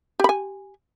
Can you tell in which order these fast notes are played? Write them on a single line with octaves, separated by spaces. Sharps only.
G4 B5 G#5